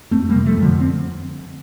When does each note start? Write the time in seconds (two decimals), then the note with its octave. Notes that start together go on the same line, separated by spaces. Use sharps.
0.11 F2 A3 C4
0.29 C3 G3 A#3
0.45 F3 A3
0.57 F2
0.62 D3 F3
0.80 C4